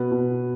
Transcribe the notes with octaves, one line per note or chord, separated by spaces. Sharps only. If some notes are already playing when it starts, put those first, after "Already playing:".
Already playing: B2 B4
B2